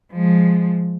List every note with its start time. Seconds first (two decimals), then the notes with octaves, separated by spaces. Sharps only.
0.13 F3 G#3